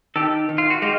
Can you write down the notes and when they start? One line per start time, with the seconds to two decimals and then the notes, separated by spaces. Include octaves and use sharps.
0.16 D#3 G4 A4
0.49 D#3
0.58 F4
0.70 F#4
0.82 G#3 F4 G4